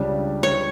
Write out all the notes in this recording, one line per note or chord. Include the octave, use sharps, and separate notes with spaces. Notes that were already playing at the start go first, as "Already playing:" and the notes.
Already playing: C#2 C#3 G3 D4
C#5